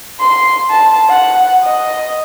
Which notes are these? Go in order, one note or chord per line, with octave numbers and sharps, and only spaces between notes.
C6
A5
F#5
D#5